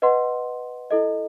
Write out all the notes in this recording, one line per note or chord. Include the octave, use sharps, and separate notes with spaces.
B4 D#5 F#5 C6
E4 A4 D#5